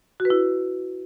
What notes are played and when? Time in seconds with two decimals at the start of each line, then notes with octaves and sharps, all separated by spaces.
0.20 F#4
0.25 B4
0.30 E4